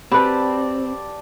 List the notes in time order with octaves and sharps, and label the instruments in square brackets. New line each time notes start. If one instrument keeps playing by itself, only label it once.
[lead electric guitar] C4 [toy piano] F#4 B5 [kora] G4 B4 [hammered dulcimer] D5 G5 A5